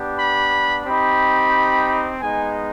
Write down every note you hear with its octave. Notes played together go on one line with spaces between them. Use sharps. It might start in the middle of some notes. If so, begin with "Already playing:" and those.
Already playing: B3 D4 G4
B5
C4 D#4 G4 B5
G#3 B3 D#4 G#5